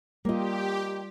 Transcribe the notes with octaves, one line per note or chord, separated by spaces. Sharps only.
G3 A#3 F4 G4 D#5